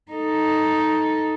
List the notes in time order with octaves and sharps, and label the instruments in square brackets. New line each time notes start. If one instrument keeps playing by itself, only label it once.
[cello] D#4 A4